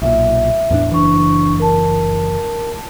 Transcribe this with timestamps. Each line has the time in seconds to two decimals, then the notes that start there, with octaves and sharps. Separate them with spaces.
0.02 B1 A#2 E5
0.71 E2 A2 D4
0.92 F#1 E3 D4 C#6
1.60 A#4 A5